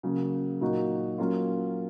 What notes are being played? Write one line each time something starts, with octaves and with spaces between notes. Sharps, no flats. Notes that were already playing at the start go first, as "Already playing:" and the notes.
C#3 F#3 A#3
A#2 F#3 A#3 D#4 F#4
F#3 A#3 C#4 F4